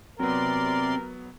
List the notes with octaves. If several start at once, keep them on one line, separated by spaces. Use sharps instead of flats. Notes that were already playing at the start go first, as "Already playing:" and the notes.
C3 F#3 B3 C4 A#4 D5 C6